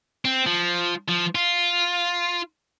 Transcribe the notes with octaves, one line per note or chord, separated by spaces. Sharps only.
C4
F3
F3
F4